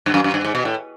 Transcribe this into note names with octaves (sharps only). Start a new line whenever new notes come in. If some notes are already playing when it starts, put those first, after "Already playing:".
G2
F#2
F#2
G2
G#2
B2
A2